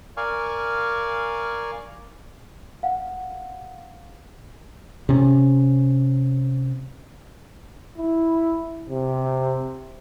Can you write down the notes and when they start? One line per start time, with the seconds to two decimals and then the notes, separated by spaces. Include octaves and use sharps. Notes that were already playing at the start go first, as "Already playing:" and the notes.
0.17 A#4 D5 F5 G#5 C#6
2.83 F5 F#5
5.09 C3 C#4
7.98 E4
8.89 C3